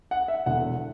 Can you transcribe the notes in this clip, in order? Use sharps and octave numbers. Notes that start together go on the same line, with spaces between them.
F#5
E5
E1 E2 D3 F#5